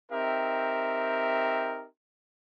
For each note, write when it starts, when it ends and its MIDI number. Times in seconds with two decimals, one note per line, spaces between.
0.12 1.87 60
0.12 1.87 63
0.12 1.87 67
0.12 1.87 70
0.12 1.87 76